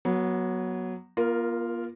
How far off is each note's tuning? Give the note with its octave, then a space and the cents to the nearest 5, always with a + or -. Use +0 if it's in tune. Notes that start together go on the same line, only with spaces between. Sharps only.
F#3 +0 B3 -30
A#3 +45 F4 -10 A#4 +0